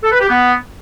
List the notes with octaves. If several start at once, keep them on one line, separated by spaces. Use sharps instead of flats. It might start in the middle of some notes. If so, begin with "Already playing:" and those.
A4
B4
G4
B3